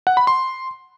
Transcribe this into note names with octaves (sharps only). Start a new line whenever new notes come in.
F#5
B5
C6